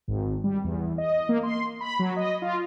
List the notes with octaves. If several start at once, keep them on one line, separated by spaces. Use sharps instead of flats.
G#1
G3
E2
D#5
A#3
C6
B5
F#3
D#5
F4